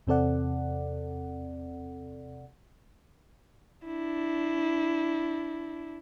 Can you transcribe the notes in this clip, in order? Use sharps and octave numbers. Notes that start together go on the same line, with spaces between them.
E2 C3 C4 A4 D5 F#5
D4 E4